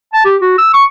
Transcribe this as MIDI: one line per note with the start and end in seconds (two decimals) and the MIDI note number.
0.13 0.24 81
0.25 0.36 67
0.41 0.54 66
0.58 0.71 88
0.74 0.85 85